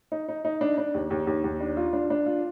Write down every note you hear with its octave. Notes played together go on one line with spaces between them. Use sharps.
D#4
D#4
D#4
D4
D4
D#2
D#2
D#2
D#2
D4
F4
D4
D4
F4